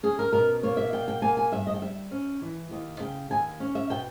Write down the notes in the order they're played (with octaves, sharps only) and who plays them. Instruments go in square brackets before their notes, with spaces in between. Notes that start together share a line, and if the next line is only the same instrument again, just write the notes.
[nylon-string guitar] C#4 G#4
A#4
B2 A#4
A#3 C#5
E5
B2 G5
G5
A#3 G#5
G#5
G2 E5
D#5
G5
G3 E5
C#4
E3
D#2
C#3 G5
D#2 G#5
C#4
E5
B2 G5